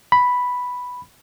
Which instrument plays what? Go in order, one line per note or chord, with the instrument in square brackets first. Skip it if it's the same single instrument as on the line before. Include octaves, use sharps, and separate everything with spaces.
[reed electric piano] B5